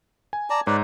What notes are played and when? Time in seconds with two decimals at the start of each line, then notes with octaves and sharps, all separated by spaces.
0.33 G#5
0.50 D5 A5 A#5
0.67 G#2 B4 C#5 D5 A#5